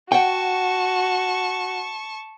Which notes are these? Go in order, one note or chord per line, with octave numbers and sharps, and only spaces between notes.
F#4 F#5 G5 A5 C#6